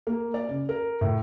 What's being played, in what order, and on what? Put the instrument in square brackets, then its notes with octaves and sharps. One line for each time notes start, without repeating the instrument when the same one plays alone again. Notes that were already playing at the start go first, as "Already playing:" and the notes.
[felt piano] A#3
D5
C#3
A#4
A2